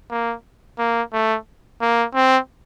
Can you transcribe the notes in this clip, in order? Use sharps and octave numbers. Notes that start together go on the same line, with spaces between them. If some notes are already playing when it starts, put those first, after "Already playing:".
A#3
A#3
A3
A#3
C4